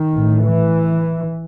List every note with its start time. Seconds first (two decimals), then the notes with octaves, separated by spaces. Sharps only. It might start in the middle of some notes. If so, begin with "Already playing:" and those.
Already playing: D#3
0.12 A1 A2
0.41 E3